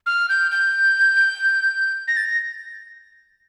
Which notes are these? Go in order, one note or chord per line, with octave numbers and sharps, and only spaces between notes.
F6
G6
G6
A#6
A6
A#6